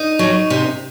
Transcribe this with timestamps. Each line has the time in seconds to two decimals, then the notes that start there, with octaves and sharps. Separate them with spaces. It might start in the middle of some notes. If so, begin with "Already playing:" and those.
Already playing: D#4
0.19 F#3
0.50 C3